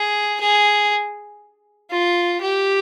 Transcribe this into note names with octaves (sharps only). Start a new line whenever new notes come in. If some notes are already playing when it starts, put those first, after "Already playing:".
Already playing: G#4
G#4
F4
G4